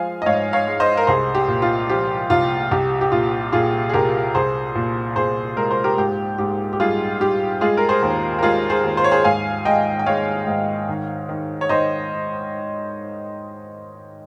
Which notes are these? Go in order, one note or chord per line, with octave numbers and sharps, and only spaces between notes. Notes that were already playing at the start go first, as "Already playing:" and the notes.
Already playing: F3 G#3 F5 G#5
D#5
G#2 C#5 F5
C#5 F5
G#3
C5 D#5
A#4
C2 G#4 C5
G4
A#2
F4
F3 G4
C2 F4
C2 G4
G4
A#2 F4
A#2 F4 G#4
G#4
C2 G4 A#4
C2 G#4 C5
A#2
A#2 G#4 C5
G#3 A#4
C5
G4 A#4
G#2 G4
G#2 G4
G4
G3 F4 G#4
G3 G4
G#3 F4 G#4
A#4
G#4 C5
D#2
A#4
G#3 F4 G#4
G#4 C5
D#2
C5
C#5
G#4 C5
G#2 F5 G#5
G#3 D#5 G5
G5
G#3 C#5 F5
G#2
D#3
D#3
C#5
D#3 C5 D#5